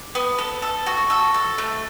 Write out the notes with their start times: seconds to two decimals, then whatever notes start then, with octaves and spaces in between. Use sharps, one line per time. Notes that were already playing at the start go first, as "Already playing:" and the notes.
Already playing: D6
0.15 B3
0.38 A4
0.62 A4
0.86 F#4
1.10 A4 E6
1.34 A4
1.58 A3